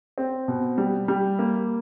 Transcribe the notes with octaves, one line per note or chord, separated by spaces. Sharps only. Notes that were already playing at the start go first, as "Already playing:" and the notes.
C4
B2
G3
G3
A#3